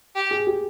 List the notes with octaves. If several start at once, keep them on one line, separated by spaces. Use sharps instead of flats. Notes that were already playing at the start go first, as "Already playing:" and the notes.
G4
G#4
G4